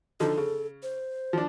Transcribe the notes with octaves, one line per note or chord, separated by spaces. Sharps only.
D3 F3 D#4 A4
C#3
C5
F3 D4